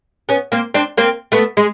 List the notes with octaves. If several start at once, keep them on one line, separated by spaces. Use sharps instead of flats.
B3 C#4
A#3 C4
C4 D4
A#3 C4
A3 B3
G#3